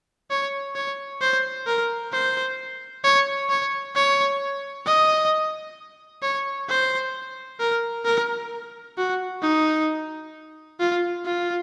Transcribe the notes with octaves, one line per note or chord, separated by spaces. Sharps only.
C#5
C#5
C5
A#4
C5
C#5
C#5
C#5
D#5
C#5
C5
A#4
A#4
F#4
D#4
F4
F4